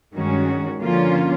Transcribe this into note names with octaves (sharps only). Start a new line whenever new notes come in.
G2 D#3 G#3 C#4 F#4
D3 F3 A#3 C#4 F4